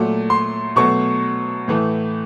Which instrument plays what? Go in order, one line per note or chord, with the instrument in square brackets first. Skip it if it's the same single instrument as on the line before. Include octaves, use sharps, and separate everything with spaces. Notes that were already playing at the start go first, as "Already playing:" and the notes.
Already playing: [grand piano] A#2 F#3 A3
C6
B2 F#3 A3 C#6
A2 E3 A3